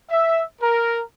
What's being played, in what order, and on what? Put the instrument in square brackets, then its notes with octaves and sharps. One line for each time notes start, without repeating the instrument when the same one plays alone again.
[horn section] E5
A#4